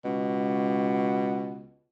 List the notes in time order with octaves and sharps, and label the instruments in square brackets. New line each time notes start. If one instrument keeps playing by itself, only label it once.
[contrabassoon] C#2 [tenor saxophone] B2